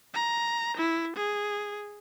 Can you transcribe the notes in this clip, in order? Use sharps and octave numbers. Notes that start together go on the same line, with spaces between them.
A#5
E4
G#4